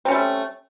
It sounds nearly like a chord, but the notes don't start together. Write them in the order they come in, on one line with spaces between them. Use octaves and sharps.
C4 C#4 G3 A3